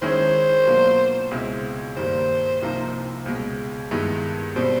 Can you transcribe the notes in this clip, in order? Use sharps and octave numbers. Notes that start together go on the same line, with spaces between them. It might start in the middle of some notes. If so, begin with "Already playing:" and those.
D#3 G#3 C#4 E4 G#4 C5
B2 F#3 A#3 D4 F4
C#2 B2 G#3 C4 E4
G2 D#3 G3 A#3 C5
C2 C3 F3 A#3 D#4
C#2 B2 G#3
G2 D#3 G#3 B3 E4
B2 G3 C4 C5